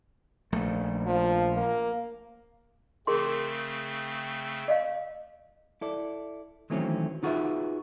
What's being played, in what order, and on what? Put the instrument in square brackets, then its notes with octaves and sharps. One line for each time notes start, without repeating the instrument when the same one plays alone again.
[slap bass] A#1 A3
[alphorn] F3
A#3
[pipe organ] C#3 A3 C4 [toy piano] G#4 A#4 C6
[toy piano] D5 D#5 F5
[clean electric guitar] E4 A4 D5
D#3 E3 F#3 A3 C4 C#4
D#4 F4 F#4 G#4 B4 E5